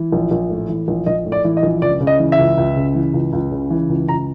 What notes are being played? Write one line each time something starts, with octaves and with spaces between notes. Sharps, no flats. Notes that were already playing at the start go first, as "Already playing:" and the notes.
Already playing: E3
A#1
A#1
A2
E3
A#1
A#1 D#5
A2
D5
E3
D#5
A#1
C#2 D5
C#3
D#5
E3
E5
C#2
C#2
C#3
E3
C#2
C#2
C#3
E3
C#2
C#2 A#5